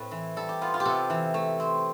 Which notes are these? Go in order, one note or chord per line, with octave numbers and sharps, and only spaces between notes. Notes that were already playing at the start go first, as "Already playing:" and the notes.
Already playing: A2 C4 B4 E5
E3
G3 A4
G4
B3 F4
F4
G4
C3 A4
E3
A3
C4